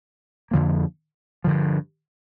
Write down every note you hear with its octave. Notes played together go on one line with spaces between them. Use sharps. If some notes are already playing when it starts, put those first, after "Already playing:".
F2 D3 F3 A#3
G2 D3 F3